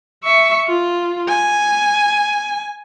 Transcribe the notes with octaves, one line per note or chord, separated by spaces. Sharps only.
E5 C#6
F4
G#5